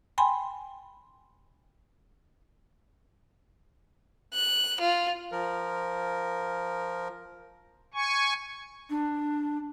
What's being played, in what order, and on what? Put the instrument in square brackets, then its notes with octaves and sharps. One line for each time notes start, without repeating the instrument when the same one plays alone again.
[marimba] G5 G#5 B5 C6
[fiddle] F#6
F4
[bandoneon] F3 A#4
[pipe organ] G#5 C#6
[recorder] D4